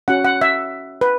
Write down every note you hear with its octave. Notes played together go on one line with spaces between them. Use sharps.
C#4 F#4 F#5
F#5
E5
B4